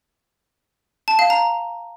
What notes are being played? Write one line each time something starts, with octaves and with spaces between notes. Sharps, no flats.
A5
F5
A#5